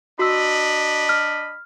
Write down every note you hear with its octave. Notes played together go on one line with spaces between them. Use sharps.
D4 F#4 D#5 B5 E6
F6